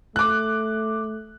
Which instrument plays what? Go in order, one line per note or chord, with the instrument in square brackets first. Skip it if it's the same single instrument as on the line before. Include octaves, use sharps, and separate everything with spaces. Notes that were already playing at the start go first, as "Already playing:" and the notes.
[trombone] A3 [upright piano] D6 F#6